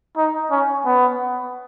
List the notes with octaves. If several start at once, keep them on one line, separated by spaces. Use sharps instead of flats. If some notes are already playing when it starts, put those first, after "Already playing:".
D#4
C#4
B3